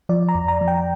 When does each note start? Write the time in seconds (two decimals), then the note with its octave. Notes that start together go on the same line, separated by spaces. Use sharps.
0.09 F3 D5
0.29 A#5
0.35 F2
0.48 A#5
0.61 F3
0.68 G5